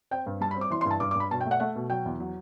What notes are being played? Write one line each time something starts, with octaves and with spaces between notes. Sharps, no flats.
C4 G5
G2
G3 A5
B5
C4
D6
E3 C6
C6
G2 A5
G2 D6
D6
G2 B5
B2 A5
G5
A3 F#5
A3 F#5
B2
F#3 G5
E2
F#3